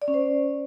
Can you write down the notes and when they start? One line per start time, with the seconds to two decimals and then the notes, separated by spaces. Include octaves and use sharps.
0.02 D5
0.08 C#4
0.14 C5